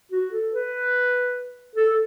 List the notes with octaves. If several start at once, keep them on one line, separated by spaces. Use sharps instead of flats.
F#4
A4
B4
A4